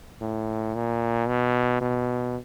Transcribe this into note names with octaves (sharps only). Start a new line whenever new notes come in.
A2
A#2
B2
B2